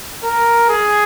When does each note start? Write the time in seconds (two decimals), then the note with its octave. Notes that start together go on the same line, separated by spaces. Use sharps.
0.23 A#4
0.69 G#4